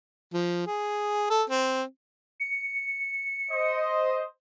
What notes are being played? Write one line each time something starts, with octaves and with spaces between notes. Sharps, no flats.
F3
G#4
A4
C4
C#7
C5 D#5